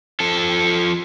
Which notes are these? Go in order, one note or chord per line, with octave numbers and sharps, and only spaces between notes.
F3 A4